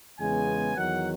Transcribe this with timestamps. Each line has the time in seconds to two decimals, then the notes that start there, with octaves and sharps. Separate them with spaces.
0.19 E2 C#3 G#3 B3 G#5
0.76 E2 D#3 F#3 F#5